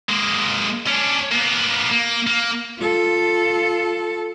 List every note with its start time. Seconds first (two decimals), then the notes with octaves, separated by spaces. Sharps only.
0.09 G#3 A#3
0.87 C#4 D4
1.31 A#3 B3
1.91 A#3
2.27 A#3
2.80 F4 A4